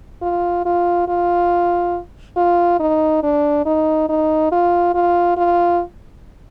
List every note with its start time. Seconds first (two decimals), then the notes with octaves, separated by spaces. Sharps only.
0.22 F4
0.66 F4
1.08 F4
2.37 F4
2.80 D#4
3.23 D4
3.66 D#4
4.09 D#4
4.52 F4
4.94 F4
5.37 F4